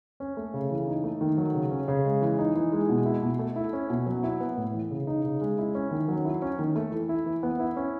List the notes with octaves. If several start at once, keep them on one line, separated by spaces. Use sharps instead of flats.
C#4
A3
C#3
E3
D#4
A3
D#3
F#3
C#3
C#4
C#3
G#3
E3
D#4
E3
G#3
B2
E4
B2
A3
E4
C#4
B2
F#3
E4
B3
A2
E3
C#3
D#4
C#3
G#3
E4
C#4
D#3
F#3
E4
C#4
D#3
A3
E3
E4
E3
B3
E4
C#4